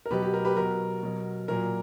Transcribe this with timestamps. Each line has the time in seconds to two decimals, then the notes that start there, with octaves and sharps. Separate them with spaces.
0.06 A#4
0.11 B2 F#3 G4 B4
0.22 G4
0.34 A#4
0.45 G4 B4
0.56 B2 F#3 A#4
1.03 B2 F#3
1.48 A#2 F#3 A#4